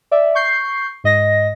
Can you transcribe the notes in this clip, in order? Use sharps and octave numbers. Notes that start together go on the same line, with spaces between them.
D5 E5
C#6 G6 C7
G#2 D#5 A#6